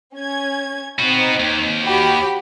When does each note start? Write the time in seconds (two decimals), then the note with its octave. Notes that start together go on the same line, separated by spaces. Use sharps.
0.15 C#4 G#6
0.98 B3 C4 D#4 F#4
1.40 D#2
1.85 F#4 G4 B5